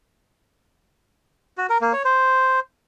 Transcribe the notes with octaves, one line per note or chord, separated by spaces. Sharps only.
F#4
A#4
A#3
C#5
C5